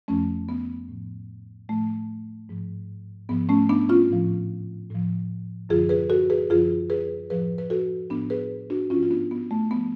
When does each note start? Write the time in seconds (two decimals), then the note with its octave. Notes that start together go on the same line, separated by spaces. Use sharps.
0.08 F2 F3 A3 C#4
0.49 B3
0.89 A2 F3
1.68 A2 F3 A3
2.49 G#2 F3
3.29 G#2 F3 B3
3.49 A3 C#4
3.69 B3 D4
3.89 C#4 F4
4.10 A2 F3
4.90 A2 F3
5.69 F#2 D3 F3 F4 G#4
5.89 G#4 B4
6.10 F#4 A4
6.30 G#4 B4
6.50 F#2 D3 F3 F4 G#4
6.90 G#4 B4
7.30 A2 F3 G#4 B4
7.58 B4
7.70 F#4 A4
8.10 A2 F3 B3 D4
8.30 G#4 B4
8.70 D4 F#4
8.90 G#2 C#4 F4
8.94 F3
9.03 F4
9.10 B3 D4
9.31 B3
9.51 A3
9.71 F3 B3